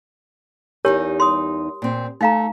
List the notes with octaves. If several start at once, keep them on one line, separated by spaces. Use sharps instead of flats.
E2 D#4 G4 A#4 C#5 G#5
C6 D#6
A#2 C4
A3 D#4 F5 A#5